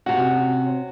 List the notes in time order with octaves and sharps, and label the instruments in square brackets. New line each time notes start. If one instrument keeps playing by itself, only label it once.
[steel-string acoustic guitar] C3 C#4 [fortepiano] F#4